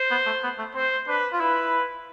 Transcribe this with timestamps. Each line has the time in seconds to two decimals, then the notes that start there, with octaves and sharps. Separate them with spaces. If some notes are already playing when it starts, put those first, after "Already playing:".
Already playing: C5
0.11 B3
0.26 A3
0.44 B3
0.59 A3
0.75 C4 C5
1.08 D4 B4
1.33 F4
1.41 E4 B4